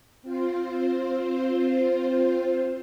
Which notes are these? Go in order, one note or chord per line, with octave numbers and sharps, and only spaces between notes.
C4 F4 C5